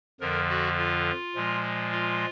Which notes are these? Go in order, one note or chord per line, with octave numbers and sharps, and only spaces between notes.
F2 D3 F3 A#4
F#4
F4
A#2 F3 G#3
F4